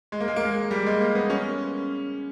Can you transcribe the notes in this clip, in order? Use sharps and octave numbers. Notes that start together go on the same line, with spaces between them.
G#3
A#3
G#3
A#3
G#3
G3
G#3
A#3
B3
C#4